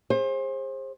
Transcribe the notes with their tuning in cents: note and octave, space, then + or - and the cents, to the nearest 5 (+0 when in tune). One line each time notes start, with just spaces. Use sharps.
G#4 -30 C5 +30